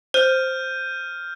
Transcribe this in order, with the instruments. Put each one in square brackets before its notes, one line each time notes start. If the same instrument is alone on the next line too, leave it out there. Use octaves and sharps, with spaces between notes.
[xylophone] C5 [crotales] F6 G6 D#7